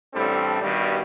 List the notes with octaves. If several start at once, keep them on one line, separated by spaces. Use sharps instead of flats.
A1 A2 G3 C4 D4 A4
G2 B2 D#3 G3